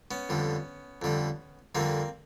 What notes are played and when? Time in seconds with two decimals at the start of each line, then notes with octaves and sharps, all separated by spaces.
0.11 B3 C#4
0.29 F2 D3 G3
1.02 F2 D3 G3
1.75 F2 D3 G3 A#3 C4